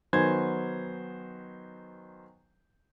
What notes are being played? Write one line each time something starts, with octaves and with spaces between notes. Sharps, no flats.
D#3 F#3 B3 C5 G#5 G#6